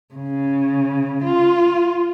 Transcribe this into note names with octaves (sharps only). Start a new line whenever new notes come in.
C#3
F4